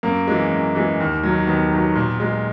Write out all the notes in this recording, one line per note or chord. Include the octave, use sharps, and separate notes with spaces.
F#2 A#3
E3 G#3
F#2
E3 G#3
D#2
F#3
D#3
D#2 B3
D#3 F#3
A#2
G#3